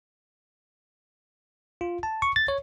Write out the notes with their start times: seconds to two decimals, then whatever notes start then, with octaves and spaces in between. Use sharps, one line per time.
1.81 F4
2.03 A5
2.22 C#6
2.36 A6
2.48 C#5